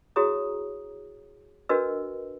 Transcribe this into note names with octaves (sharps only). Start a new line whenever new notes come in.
E4 F#4 G#4 C#5 A#5 D#6
D4 F#4 A#4 B4 D#5 E6